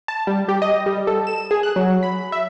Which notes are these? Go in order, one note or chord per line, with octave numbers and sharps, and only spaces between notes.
A5
G3
G4
D#5
G3
A4
E7
G#4
F#6
F#3
B5
E5